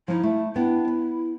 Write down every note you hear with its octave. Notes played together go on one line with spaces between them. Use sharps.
F3 D#4 E4
A3
B3 D4 E4 G5
B4